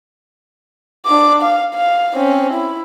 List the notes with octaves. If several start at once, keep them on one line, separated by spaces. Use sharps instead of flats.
D4 D6
F5
F5
C4 C#4
E4